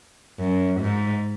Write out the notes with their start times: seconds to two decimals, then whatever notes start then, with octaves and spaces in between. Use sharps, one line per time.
0.39 F#2
0.81 G#2